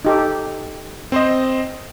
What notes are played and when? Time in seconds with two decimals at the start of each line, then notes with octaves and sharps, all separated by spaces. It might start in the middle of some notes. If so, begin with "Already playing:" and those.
0.05 D#4 G4 A4
1.12 C4 C5 D#5